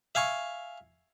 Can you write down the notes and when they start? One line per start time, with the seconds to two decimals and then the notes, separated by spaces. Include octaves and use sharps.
0.15 E5 F5 G#5 C#6